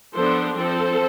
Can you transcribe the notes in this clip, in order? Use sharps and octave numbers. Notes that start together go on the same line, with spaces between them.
F3 B3 D4 A4 C5
F3 C4 A4 C5